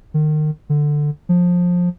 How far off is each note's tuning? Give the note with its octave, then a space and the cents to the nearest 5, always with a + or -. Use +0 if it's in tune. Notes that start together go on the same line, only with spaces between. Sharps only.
D#3 -30
D3 +10
F3 +20